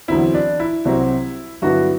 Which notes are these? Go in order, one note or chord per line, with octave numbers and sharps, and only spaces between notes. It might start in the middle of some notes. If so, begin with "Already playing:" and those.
E2 D3 F#3 C4 E4
D4
E4
C2 C3 F#3 C4 F#4
G2 D3 F#3 B3 E4 F#4